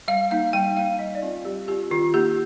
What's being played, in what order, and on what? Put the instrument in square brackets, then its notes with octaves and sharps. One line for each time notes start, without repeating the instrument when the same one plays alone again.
[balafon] G3 F5
A#3 D#4 F5
G3 G5
A#3 D#4 F5
G3 D#5
D5
C4 F4
G3 G4
C4 F4 G4
D#3 F4
A#3 D#4 G4